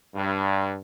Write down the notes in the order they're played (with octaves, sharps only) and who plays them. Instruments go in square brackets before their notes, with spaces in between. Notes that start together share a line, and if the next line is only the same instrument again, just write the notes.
[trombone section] G2